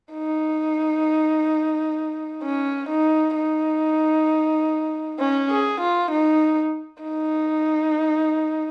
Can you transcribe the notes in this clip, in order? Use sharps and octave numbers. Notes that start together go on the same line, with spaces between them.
D#4
C#4
D#4
D#4
C#4
G#4
F4
D#4
D#4